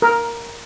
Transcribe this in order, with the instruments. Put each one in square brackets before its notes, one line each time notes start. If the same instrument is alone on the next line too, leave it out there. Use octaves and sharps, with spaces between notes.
[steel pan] A#4